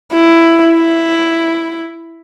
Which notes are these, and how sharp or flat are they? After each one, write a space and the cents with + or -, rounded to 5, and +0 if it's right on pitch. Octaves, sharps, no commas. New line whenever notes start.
E4 +10
E4 +5